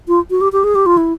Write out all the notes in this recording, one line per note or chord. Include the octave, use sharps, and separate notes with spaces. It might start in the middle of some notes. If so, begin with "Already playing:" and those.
F4
F#4
G4
G4
G#4
G4
F4
E4